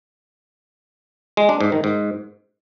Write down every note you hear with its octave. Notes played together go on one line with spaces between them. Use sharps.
G#3
D4
G#2
D#3
G#2